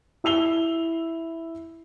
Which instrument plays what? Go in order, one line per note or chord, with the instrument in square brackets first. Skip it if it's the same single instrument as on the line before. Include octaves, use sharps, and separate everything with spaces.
[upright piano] E4 E6 F7 G7